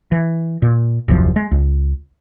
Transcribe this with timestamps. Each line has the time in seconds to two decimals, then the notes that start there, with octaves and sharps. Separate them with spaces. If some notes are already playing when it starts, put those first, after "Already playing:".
0.12 E3
0.62 A#2
1.08 D#1 C2 F#2 F3
1.36 G#3
1.51 C#2